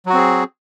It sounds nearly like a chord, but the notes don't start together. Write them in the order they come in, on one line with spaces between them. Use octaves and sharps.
F#3 F#4 C4 G#4